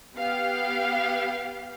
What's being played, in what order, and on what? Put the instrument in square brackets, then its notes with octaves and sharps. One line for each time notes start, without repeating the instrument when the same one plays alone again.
[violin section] B3 G4 F5